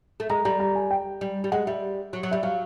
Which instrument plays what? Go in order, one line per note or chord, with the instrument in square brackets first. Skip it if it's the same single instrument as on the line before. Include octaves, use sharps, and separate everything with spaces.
[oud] A3
[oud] G#3 [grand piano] A#5
[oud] G3 [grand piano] A#5
[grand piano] A#5
G#5
G5
[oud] G3
G3
[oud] G#3 [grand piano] F#5
[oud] G3 [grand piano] E5
[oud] F#3
F#3
[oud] G3 [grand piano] E5
[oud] F#3 [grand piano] F5